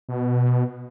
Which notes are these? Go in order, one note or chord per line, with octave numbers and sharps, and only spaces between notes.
B2